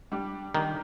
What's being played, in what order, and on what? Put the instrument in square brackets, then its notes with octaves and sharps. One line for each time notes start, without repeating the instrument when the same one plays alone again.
[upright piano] G3 D4 G4
[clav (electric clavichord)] D#3 [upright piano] G3 D4 G4